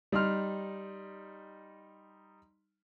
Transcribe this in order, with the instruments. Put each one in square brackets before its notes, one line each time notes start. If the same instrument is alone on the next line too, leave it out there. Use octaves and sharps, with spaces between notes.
[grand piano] G3 D#4 C6 F6